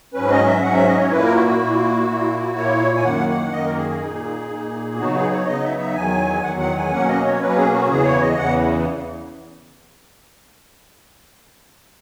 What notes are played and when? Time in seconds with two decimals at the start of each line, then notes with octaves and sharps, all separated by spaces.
0.14 G#2 F#3 C#4 B4
0.31 D#5
0.46 E5
0.63 G#2 F#3 C#4 F#5
0.74 E5
0.87 D#5
0.99 C#5
1.11 A#2 A#3 E4 B4
1.22 A#4
1.35 F#4
1.48 F#4
1.60 A#2 A#3 E4
2.08 A#2 A#3 E4
2.56 A#2 A#3 E4 C#5
2.97 G#5
3.04 F#2 D#3 A#3 F#5
3.29 F#5
3.52 F#2 D#3 A#3 D#5
3.65 A#4
3.78 G#4
3.89 G#4
4.01 A#2 A#3 D#4
4.50 A#2 A#3 D#4
4.98 C#3 F#3 B3 D#4 F#4
5.14 G#4
5.31 C#5
5.47 C#3 F#3 B3 D#4 D#5
5.63 E5
5.79 E5
5.95 E2 D#3 F#3 G#5
6.43 E2 D#3 F#3 F#5
6.60 F#5
6.76 G#5
6.92 B2 F#3 A#3 C#4 F#5
7.09 D#5
7.25 C#5
7.40 B2 F#3 A#3 C#4 B4
7.56 G#4
7.73 F#4
7.89 E2 C#3 E3 G#4
8.05 C#5
8.21 D#5
8.37 E2 C#3 E3 F#5